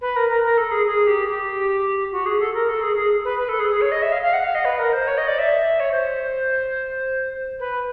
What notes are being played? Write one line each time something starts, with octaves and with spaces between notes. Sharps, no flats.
B4
A#4
A#4
A#4
A4
G#4
G#4
G4
G4
F#4
G#4
A4
A#4
A4
G#4
G#4
B4
B4
A4
G#4
G#4
C#5
D#5
E5
F5
F5
F#5
F5
D#5
B4
A#4
C5
C#5
D#5
D5
E5
C#5
C5
B4